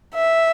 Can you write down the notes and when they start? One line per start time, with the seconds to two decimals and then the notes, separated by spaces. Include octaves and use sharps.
0.14 E5